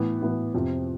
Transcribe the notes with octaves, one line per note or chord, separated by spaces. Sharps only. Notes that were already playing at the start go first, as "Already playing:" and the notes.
Already playing: A2 E3 B3
A2 E3 B3
F2 C3 F3 C4